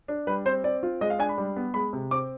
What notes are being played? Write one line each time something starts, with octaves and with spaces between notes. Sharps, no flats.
D4
G3 B4
C4 C5
C4 D5
F4
G#3 D#5
F5
D4 G#5
B5
G3
B3
G#3 B5
C3
C4 D6